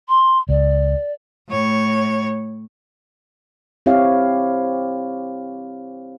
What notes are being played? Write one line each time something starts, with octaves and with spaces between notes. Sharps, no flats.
C6
C#2 D5
A2 C#5
C4 E4 G4 C#5 F5